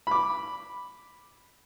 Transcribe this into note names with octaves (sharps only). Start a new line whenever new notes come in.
B5 D6